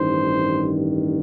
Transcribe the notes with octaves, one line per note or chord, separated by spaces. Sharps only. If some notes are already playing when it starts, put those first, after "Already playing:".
Already playing: A1 G2 D#3 C5